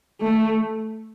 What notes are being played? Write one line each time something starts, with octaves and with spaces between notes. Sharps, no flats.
A3